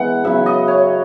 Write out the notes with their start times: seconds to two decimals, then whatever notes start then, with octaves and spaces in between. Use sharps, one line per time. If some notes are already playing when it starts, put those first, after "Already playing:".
Already playing: E3 G#3 B3 E4 F#5
0.24 C#3 F#3 C#4 E4 E5
0.46 D#5
0.68 C#5